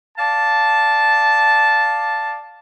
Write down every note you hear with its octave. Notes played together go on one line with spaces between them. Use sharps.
D5 F5 A5